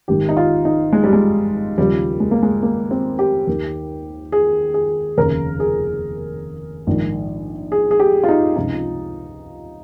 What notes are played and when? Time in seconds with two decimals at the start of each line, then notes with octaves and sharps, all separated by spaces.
0.08 G#1 G#2 D#3 G4
0.29 D#4
0.37 F4
0.65 D#4
0.93 G#3
1.04 G3
1.13 G#3
1.78 D#2 C#3 F3 G3
2.20 G#3
2.31 A#3
2.43 G#3
2.63 A#3
2.91 C4
3.19 G4
3.47 D#2 D#3
4.32 G#4
4.74 G#4
5.17 F1 D#2 C#3 A#4
5.60 G#4
6.87 A#1 G#2 D#3
7.72 G#4
7.91 G#4
8.00 G4
8.24 F4
8.29 D#4
8.56 C#2 C3 F3 D#4